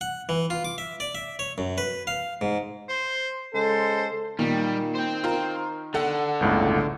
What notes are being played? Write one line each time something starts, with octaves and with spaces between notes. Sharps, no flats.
F#5
E3
F4
D6
E5
D5
E5
C#5
F#2
B4
F5
G#2
C5
C#3 G#3 A4 C5
A#2 D#3 G3
C5 G5
F4 A#4
D3 A4 F#5
G1 C#2 A2